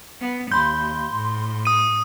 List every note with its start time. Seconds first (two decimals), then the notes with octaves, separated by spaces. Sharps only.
0.21 B3
0.52 D#2 B5 C6 G6
1.13 A2
1.65 D#6 D#7